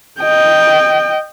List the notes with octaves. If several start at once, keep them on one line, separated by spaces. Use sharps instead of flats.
D#5 G5